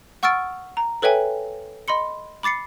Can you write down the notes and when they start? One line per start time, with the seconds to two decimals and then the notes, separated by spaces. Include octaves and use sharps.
0.23 F#5 C#6 E6 F6 A6 D7
0.77 A#5
1.02 A4 B4 C#5 E5 G5 G#5
1.88 D#5 B5 C6 C#7
2.43 B5 D6 A6 C7 C#7